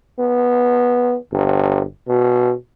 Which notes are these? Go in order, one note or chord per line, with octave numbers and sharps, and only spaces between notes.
B3
G1
B2